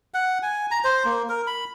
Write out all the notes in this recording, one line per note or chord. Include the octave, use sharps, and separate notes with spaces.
F#5
G#5
A#5
C5
A#3
A#4
B5